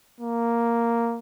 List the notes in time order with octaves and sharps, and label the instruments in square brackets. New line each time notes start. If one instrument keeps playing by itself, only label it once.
[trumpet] A#3